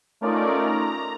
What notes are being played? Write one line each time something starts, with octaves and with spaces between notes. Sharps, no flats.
A3 C#4 D#4 F4 A#4 D5
A#5